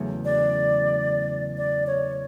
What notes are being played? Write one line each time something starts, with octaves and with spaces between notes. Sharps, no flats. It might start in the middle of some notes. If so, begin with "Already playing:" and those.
Already playing: E2 C#3 F#3 A3 C#4
D5
D5
C#5